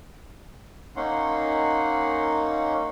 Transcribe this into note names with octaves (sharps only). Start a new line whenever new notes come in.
A#3 C#4 D#4 F#5 C6